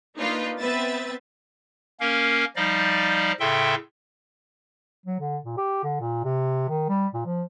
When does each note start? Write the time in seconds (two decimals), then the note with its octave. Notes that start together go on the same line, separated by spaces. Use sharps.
0.18 A#3 D4 D#4 F4 B4
0.60 B3 C4 B4 E5 A6
2.00 A#3 C#4 A#4 F5
2.56 F3 G3 D#4 D5 D#5 F5
3.40 A2 C#3 A4 E5 G5 C6
5.06 F#3
5.20 D3
5.45 A#2
5.57 G4
5.84 D3
6.00 A#2
6.24 C3
6.69 D#3
6.89 G3
7.14 A#2
7.25 F3